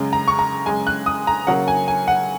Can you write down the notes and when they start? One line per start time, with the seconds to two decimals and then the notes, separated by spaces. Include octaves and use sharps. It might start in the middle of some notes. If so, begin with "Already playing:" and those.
Already playing: F#2 C#3 G#3
0.13 A#5
0.28 C#6
0.39 A#5
0.66 F#2 C#3 G#3 G#5
0.87 F#6
1.06 D#6
1.27 A#5
1.47 C#3 F#3 A#3 F#5
1.68 G#5
1.88 G#5
2.08 F#5